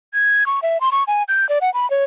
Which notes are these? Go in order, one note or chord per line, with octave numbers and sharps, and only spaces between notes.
G#6
C#6
E5
C6
C#6
G#5
G6
D5
F#5
B5
C#5